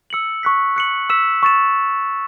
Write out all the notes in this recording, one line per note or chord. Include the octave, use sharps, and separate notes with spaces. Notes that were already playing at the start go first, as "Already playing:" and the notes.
E6 C#7 F#7
C#6 F#6 B6
F#6 C#7 F#7
E6 B6 E7
C#6 A6 E7